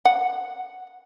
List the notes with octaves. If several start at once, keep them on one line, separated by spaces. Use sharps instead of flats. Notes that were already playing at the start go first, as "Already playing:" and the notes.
F#5